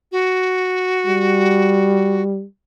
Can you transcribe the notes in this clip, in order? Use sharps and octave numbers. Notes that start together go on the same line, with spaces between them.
F#4
G3